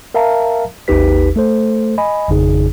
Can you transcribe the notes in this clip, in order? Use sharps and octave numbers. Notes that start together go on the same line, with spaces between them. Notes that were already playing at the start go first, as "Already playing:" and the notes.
A#4 E5 F5 A5 A#5
G#1 D#2 D#4 G4 B4 B6
A3 A4 C5
D#5 G#5 B5
G#1 F2 C#3 D#4 G#4